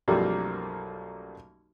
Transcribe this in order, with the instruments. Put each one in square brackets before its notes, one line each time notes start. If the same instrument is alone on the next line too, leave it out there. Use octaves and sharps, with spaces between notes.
[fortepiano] B1 F#2 F3 G3 A3 A#3